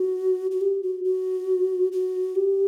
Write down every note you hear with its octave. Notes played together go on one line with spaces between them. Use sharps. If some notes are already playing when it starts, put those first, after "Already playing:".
Already playing: F#4
F#4
G4
F#4
F#4
F#4
G4